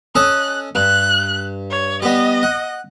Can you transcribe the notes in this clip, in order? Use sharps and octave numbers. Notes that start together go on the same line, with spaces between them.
C#4 A4 D#5 F#6
G2 F#6
C#5
G3 B3 D#5
F#5